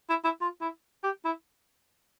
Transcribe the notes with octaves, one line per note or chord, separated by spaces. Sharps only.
E4
E4
F4
E4
G4
E4